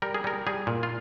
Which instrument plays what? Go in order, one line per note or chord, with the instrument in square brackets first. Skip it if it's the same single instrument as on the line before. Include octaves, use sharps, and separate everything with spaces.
[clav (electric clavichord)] G3 A#4
G#4
G3 A#4
G3 G#4
A#2
F4